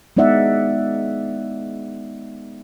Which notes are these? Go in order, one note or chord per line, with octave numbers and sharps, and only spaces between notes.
G#3 B3 D#4 D5 E5 F#5